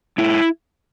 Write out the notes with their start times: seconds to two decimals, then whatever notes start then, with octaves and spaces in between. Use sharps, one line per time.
0.18 G#2 E4